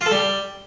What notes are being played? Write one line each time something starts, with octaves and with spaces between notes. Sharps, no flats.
F4
A4
G3